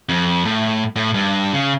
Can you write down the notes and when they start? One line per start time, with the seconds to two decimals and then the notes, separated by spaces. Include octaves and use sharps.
0.09 F2
0.45 A2
0.96 A2
1.14 G2
1.53 C#3